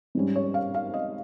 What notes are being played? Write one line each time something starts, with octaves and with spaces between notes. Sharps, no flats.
G#2 G3 C#4
C#5
F5
F5
D#5